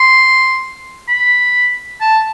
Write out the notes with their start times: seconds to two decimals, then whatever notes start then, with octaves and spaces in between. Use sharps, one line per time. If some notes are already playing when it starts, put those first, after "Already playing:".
Already playing: C6
1.08 B5
2.01 A5